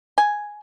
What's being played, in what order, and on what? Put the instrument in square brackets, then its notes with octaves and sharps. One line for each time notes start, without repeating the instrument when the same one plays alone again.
[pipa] G#5